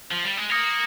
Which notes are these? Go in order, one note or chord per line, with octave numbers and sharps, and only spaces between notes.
F3
G3
G#3
A#3 D#6 A#6 C#7 F7